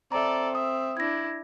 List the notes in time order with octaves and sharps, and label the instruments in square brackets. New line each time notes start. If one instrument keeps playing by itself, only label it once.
[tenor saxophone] C4 [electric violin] A4 D5 [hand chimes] E5 A#5
[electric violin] E5 [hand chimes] D#6
[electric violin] D4 E4 [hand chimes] G#6 A#6